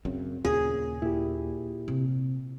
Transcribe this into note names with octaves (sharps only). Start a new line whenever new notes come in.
F#2 C#3 C4
D#2 A#2 C#3 G#4
A#2 E4 G4
C3